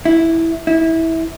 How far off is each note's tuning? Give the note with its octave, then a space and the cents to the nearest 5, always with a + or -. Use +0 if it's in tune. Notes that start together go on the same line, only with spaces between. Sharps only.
E4 -5
E4 -20